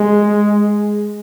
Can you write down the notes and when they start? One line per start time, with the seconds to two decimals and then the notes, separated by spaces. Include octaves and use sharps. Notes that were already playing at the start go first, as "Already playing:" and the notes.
Already playing: G#3